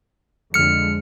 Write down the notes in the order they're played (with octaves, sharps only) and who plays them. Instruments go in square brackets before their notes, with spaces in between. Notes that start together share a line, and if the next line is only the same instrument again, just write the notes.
[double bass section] F2 D3 G#3 [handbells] F6 C#7